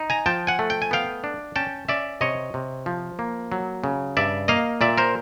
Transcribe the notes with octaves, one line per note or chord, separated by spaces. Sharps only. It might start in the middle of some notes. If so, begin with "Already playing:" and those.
Already playing: D#4
G#5 A#5
F3 G5 A5
F#5 G#5
A3
G5
G#5
B3 F5 G5
D4
C#4 G5 A5
C#4 D5 E5
C3 C#5 D#5
C3
F3
A#3
F#3
C#3
G2 D5 E5
A#3 D#5 F5
A#2 D5 E5
A#4 C5